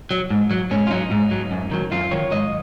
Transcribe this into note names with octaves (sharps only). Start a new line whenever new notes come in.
F#3
G#2
F#3
G#2 C#4
F4
F#3 D#4
G#2
F#3
F#2
D#3 F#3
F#2 F4
D#3 F#3 C#5
G#2 D#5